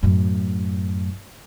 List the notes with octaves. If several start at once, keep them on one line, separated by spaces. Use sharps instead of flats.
F#2 A2